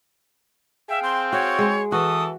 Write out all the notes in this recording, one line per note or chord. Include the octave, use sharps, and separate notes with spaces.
G#4 E5 F5 G5
C4 C6
F#4 C#5
G#3
E3 F#4 A4 D#6